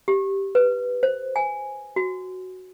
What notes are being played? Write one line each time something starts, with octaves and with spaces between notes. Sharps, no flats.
G4
B4
C5
G#5
F#4